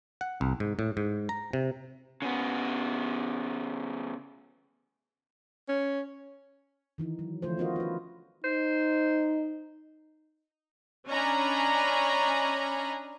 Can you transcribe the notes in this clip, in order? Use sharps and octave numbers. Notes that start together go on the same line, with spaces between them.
F#5
C2
G#2
A2
G#2
A#5
C3
C#3 B3
C#4
D#3 E3 D#4
F#3
D3 E3 F3 A3 F4 C5
B3 C#4 F4 F#4 A#4 D#5
F4 B4
D#4 C5
C#4 D4 D#5 G#5 A#5 B5